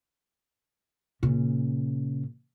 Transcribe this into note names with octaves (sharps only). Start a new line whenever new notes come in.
A#2 C#3